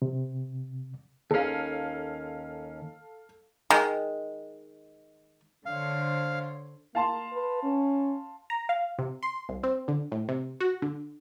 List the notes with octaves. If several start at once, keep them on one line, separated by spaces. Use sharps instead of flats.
C3
D#2 C#4 A4 F5
D#3 G#3
D3 C5 C#5 F5
A#3 F5 A5 C6
B4
C#4
A#5
F5
C3
C6
C2
C4
D3
A2
C3
F#4
D3